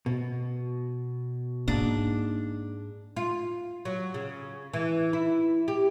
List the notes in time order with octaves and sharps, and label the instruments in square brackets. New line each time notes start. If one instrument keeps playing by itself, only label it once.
[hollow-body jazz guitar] B2
[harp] G#2 [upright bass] A#3 [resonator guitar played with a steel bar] D4
[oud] F4
F#3
C#3
E3
E4
G4